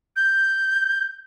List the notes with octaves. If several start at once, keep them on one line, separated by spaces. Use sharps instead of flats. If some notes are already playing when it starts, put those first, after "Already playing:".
G6